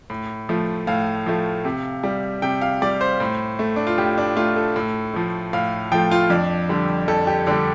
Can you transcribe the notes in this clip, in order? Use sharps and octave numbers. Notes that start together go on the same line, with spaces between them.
A2
F3 A3
A2 F5
F3 A3
C3
G3
C3 G5
F5
G3 D5
C5
A2
A3
D4
F4
A2 G4
D4
A3 F4
A4
A2
F3 A3
A2 F5
F3 A3 G5
F4
F2 D4
D3 G3
F2 A4
G4
D3 G3 D4